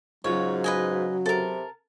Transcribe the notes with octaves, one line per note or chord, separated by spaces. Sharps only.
G#2 C#3 F#3 F4 F#4 C#5
B4 D#5 G#5
C3 A4 A#4